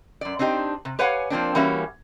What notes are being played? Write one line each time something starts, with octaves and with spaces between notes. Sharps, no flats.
F#2 D5
C4 D4 D#4 F#4 G4
C3
G4 B4 C#5 F5 F#5 G#5
F3 A#3 C4 D4
E3 G3 A#3 C#4 F#4 E5